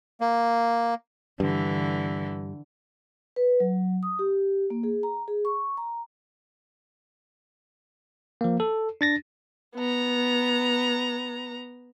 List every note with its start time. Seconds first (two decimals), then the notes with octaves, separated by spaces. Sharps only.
0.21 A#3
1.40 G2 D3 E3
3.36 B4
3.60 F#3
4.03 D#6
4.19 G4
4.70 A#3
4.83 G#4
5.03 A#5
5.28 G#4
5.45 C#6
5.77 A#5
8.41 F3 A#3
8.60 A4
9.01 D4 A6 A#6
9.76 B3 A#5